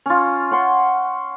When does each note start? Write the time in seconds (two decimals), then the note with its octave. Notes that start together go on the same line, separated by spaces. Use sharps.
0.06 C#4 F4
0.51 C#4 F#5 C6